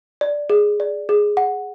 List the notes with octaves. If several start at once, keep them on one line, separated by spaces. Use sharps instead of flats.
D5
G#4
D5
G#4
F#5